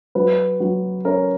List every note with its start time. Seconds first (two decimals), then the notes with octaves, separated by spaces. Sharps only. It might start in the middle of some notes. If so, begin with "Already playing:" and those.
0.15 F#3 B4
0.60 F#3
1.05 C#4 A#4